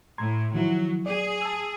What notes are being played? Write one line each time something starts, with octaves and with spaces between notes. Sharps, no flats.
A2 A#5 C6 G#6
D#3 F3 F#3 E4
G#4 D5
A5 E6